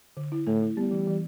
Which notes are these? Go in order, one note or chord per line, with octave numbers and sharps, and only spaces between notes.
D3
E4
A2 A3
E4
G3 B3
E3
E3